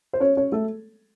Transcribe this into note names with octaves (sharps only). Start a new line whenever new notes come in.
C5
C#4 C#5
C#4 C#5
A3 A4